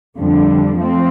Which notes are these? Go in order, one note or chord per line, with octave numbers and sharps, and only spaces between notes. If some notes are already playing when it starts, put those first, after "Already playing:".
F2 D3 G3 D4
F3 A3 C4